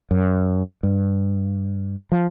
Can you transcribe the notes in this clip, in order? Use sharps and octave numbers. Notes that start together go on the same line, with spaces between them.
F#2
G2
F3